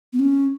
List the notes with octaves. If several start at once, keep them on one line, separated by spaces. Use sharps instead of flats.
B3
C#4